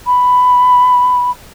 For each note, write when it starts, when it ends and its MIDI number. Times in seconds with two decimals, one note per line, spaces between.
0.06 1.30 83